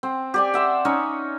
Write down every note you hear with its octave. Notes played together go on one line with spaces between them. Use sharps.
C4
G4 D5 G#5
C5 E5 F#5
C#4 D#4 C#5